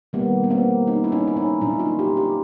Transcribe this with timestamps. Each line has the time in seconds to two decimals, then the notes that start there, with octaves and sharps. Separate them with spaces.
0.13 D#3 G3 A#3 B3
0.44 B3
0.50 A#3 C4
0.87 C#4 D#4
1.04 E4
1.12 C#4 D#4
1.28 E4
1.36 C#4 D#4
1.61 A#2 F#3 A#3 D4 E4
1.79 D#4 F4
1.99 F4 G4
2.17 F4 G4